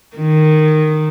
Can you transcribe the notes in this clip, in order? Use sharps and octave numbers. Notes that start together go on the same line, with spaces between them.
D#3